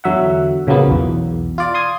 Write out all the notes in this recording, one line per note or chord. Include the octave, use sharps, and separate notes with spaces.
E2 D3 F#3 E5 F#5
A#2 C#3 F3 F#3 A#3 B3
B1 E2
F4 D5
C6 D#6 G#6